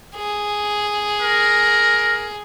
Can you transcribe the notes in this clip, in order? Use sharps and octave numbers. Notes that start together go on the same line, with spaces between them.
G#4
A#4